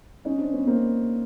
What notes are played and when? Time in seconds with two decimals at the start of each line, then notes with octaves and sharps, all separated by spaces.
0.25 C#4 D#4
0.38 C4 D4
0.52 B3 C#4
0.67 A#3 C4